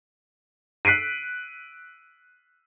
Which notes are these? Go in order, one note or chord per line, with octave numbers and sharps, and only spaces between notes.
F#6 B6 C7 D7 D#7